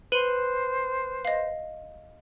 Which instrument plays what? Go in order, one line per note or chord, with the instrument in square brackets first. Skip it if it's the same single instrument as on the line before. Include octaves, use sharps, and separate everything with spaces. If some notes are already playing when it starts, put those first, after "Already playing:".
[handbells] B4 [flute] C5 [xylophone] D#7 F#7 G7
[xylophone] D#5 F5